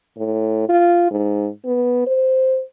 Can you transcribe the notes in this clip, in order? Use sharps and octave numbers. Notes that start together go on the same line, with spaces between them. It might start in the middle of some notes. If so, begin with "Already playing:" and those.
A2
F4
G#2
B3
C5